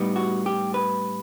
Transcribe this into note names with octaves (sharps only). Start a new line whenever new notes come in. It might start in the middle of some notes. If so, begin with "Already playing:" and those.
Already playing: A2 G3 B3 D#4
F#4
G4
B4